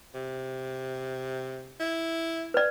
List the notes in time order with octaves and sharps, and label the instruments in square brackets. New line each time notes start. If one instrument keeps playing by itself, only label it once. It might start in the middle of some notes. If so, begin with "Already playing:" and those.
[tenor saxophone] C3
E4
[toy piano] B4 D5